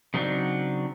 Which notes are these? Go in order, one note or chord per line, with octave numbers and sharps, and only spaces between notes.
C#3 F#3 C4 D4 D#4